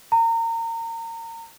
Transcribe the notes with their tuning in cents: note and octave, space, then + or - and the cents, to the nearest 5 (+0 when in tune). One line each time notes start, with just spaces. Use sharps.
A#5 -30